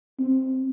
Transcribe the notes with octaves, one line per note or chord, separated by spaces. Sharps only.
C4